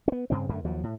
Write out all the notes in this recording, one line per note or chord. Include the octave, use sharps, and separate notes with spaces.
B3 C#4
G2 C#3 C4
F#2 D3 A3
D#2 F3 F#3
A2